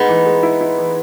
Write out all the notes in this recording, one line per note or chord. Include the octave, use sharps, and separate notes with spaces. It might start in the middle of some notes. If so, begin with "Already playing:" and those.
Already playing: G#3 B3 D#4
E3
G#3
E4
E4
E3